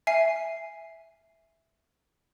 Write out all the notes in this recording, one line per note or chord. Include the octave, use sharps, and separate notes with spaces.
E5 G#5 C7